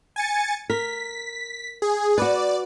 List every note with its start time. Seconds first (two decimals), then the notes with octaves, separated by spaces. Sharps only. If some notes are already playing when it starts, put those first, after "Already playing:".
0.16 G#5 A6 C#7
0.70 A#4 B6
1.82 G#4
2.18 F#4 B4 D5